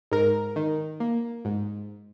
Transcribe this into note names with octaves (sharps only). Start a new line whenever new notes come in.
G#2 A#4
D#3
A#3
G#2